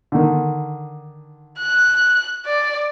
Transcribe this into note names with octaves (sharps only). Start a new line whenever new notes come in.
D3 D#3
F#6
D5